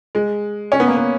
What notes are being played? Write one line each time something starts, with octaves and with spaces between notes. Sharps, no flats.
G#3
C#4
B3
A#3
B3